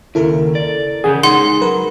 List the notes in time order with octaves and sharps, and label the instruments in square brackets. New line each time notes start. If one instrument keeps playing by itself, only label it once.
[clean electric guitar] D#2 C#3 [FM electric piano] E4 A4 A#4
[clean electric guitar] D5
[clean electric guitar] C#3 E3 C#4 [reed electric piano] G#4 [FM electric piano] F#5 G6
[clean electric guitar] G#3 C#4 [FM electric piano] D#4 [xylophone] F#5 C6
[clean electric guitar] F#3 [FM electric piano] A#4 B4